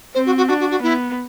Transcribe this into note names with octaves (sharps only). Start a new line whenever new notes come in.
C4 C5
F#4
F#4
D4 F#4
F#4
F#4
B3 E4